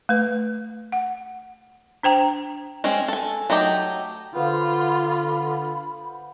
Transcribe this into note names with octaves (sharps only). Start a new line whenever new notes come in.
A3 B4
F#5
D4 C5 G5 A#5
G#3 C4 C#4
A4 G#5
F#3 A3 D#4 G4
D3 B3 F4 C5 F5 B5